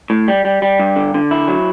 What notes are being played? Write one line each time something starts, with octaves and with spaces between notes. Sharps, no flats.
A2
G3
G3
G3
G2
D3
D3
E4
F#3